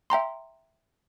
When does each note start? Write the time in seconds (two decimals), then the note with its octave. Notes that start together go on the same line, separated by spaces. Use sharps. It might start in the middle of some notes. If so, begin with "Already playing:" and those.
0.10 E5 G5 A#5 C6